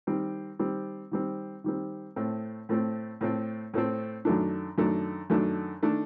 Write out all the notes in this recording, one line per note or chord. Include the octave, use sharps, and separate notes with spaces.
D#3 G3 C4
D#3 G3 C4
D#3 G3 C4
D#3 G3 C4
A2 A3 C4
A2 A3 C4
A2 A3 C4
A2 A3 C4
F#2 D#3 A3 D4
F#2 D#3 A3 D4
F#2 D#3 A3 D4
D#3 A3 D4